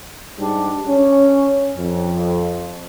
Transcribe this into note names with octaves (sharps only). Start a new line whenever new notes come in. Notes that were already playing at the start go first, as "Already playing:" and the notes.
G#2 G3 D4
C#4
F2